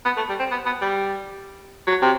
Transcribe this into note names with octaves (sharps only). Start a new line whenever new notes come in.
B3
A3
G3
C4
B3
B3
G3
F#3
C3